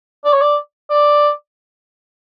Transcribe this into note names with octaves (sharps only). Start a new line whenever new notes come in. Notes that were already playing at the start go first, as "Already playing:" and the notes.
D5
C#5
D5
D5